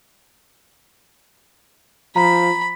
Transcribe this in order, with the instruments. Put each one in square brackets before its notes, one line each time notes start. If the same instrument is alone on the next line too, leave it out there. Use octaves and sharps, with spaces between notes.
[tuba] F3 [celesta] A#5 [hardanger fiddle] B5